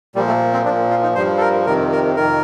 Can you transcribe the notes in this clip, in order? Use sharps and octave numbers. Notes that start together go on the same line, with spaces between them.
A#2 F3 G3
A3
C4
A#2 F3 D4
F4
D#4
G2 F3 C5
A4
A#4
F2 C3 D#3 A#4
A#4
F2 D#3 A#4